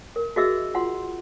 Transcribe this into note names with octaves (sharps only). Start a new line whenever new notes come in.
A#4
F#4 G#4 D#5 E5 E6
F4 F#5 C6